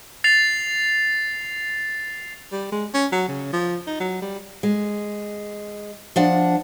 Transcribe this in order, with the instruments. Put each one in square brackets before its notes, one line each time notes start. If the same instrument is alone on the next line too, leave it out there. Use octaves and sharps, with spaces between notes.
[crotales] A6 C7 F7
[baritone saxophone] G3
G#3
C#4
F#3
C#3
F3
D#4
F#3
G3
[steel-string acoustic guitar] G#3
F3 D4 F#5